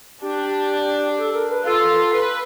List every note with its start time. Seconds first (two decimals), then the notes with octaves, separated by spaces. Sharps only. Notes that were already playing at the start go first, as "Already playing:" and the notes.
0.21 D4 G4
1.18 A4
1.33 A#4
1.50 B4
1.65 F4 A4
2.14 B4